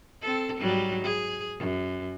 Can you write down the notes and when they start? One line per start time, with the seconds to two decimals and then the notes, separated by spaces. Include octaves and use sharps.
0.22 C4 A4
0.59 G#2 F#3 G3
1.05 G#4
1.59 F#2